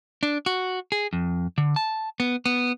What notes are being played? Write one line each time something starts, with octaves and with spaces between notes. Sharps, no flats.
D4
F#4
G#4
F2
D3
A5
B3
B3